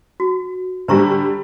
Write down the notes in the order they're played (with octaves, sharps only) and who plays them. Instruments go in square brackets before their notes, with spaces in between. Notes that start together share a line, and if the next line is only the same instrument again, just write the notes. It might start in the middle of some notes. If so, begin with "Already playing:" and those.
[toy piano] F#4
[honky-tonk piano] D3 G3 [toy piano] C5 A#5 C#6